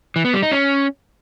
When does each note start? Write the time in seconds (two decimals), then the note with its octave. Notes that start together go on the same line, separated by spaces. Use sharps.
0.16 E3
0.25 B3
0.34 G3
0.43 D#4
0.51 C#4